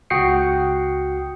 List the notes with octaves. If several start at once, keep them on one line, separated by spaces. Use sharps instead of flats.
C#2 F#4 G5 D#6 C7 C#7